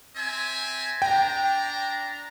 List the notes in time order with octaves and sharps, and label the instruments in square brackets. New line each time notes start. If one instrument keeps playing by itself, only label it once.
[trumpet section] C4 E5 G#5
[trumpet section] D4 A#5 [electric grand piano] G5